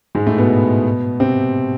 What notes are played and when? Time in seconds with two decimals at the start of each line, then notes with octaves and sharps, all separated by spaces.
0.15 G#2 G#3
0.27 A2 A3
0.38 B2 B3
1.20 C3 C4